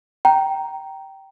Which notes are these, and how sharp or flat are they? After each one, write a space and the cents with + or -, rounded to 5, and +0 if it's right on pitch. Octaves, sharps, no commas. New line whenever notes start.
G5 -15 A#5 +0